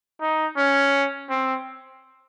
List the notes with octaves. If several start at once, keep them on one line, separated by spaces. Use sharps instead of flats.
D#4
C#4
C4